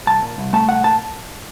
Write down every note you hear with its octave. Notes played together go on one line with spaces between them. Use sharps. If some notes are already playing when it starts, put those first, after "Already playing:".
C2 A5
A#2
C2
A3 A5
C2 F#5
A#2 A5